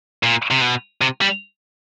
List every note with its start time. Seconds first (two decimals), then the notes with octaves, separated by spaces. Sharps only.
0.23 A#2
0.51 C3
0.61 B2
1.01 C3
1.21 G3